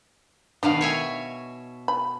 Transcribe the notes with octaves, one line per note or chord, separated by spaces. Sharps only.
B2 D#3 D4 F5 F#5
C#5 E5 G#5
B5